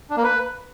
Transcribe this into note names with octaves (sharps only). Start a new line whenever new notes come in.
D4
A#3
B4